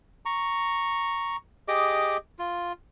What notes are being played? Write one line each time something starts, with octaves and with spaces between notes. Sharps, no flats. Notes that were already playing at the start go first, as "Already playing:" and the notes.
A#5 C#6
G4 G#4 D#5 D6
F4